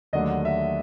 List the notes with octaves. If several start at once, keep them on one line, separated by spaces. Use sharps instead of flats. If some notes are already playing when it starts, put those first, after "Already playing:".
D#2 D3 F#3 A3 D4 D#5
E5